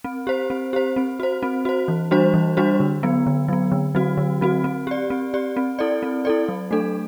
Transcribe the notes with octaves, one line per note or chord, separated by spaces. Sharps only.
C4
G4 C5
C4
G4 C5
C4
F#4 C5
C4
F#4 C5
E3
G3 D4 F#4 C5
E3
G3 D4 F#4 C5
D3
F#3 B3
D3
F#3 B3
D3
F#3 C4 F#4
D3
F#3 C4 F#4
C4
G4 D5
C4
G4 D5
C4
E4 A4 D5
C4
E4 A4 D5
F#3
A3 D4 A4